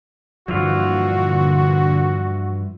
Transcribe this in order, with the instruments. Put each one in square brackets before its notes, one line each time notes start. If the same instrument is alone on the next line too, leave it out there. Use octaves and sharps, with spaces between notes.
[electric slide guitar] G2 E3 F4 [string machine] A#2 D3 [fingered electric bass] F3 [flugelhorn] F#4